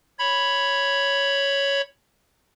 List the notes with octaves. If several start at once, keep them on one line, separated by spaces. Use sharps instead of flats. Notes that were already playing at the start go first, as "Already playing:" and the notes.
C#5 B5